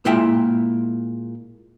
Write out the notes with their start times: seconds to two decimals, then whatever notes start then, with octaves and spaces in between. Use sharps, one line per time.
0.05 A#2 G#3 E4 E5 G5